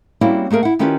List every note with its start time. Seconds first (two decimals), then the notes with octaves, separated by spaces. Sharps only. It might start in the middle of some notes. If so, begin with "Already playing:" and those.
0.21 G3 A#3 C4 C#4 E4 F#4
0.50 A3 A#3 G#4 A#4
0.63 E4 F#5
0.79 D#3 C#4 E4 F4 G4 B4